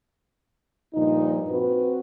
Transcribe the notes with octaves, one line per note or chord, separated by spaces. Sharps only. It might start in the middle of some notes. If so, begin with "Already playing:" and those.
G2 A#2 F3 D#4
C4 F#4 B4